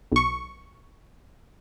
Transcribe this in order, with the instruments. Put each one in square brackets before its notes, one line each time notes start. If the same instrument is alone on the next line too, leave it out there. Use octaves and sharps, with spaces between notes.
[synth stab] B1 C#6